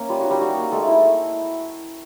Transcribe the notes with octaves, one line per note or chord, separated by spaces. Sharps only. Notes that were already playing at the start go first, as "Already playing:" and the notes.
Already playing: A#3 C#4
G3 F4
D#4 F#4
G3 G4
G3 F#4
A#3
G#3 A3 A4
E4